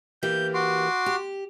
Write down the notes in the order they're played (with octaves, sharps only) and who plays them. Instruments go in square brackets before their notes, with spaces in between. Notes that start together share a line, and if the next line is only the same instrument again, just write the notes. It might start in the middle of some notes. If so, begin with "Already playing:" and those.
[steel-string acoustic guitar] E3 A#3 G4 [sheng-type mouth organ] G6
[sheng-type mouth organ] F#4 C6 D6
[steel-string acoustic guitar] G4